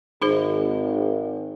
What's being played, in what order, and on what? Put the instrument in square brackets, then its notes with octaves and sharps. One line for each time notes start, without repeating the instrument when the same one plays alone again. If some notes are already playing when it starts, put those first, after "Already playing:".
[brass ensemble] G#1 [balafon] D#4 G#4 C5